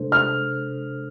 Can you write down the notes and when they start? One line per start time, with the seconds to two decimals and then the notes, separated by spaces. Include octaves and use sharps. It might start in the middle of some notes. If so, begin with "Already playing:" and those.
Already playing: C3 G#3 D4 A4 C5
0.12 F6